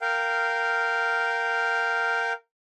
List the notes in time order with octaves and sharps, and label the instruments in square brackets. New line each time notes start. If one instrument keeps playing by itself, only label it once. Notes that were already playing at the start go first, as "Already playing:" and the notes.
[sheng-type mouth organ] A#4 F5 G5